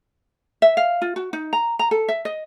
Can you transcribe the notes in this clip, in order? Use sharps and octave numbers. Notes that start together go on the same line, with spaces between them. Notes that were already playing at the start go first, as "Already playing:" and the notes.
E5
F5
F4
F#4
D#4
A#5
A#5
A4
E5
D#5